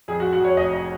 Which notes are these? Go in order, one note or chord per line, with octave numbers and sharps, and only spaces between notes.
F2 G#4
F#4
G#3
F#4
F2 C#5
F1 D#5
D#5